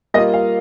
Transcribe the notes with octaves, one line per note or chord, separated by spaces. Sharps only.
G3 A#3 F4 D#5
F5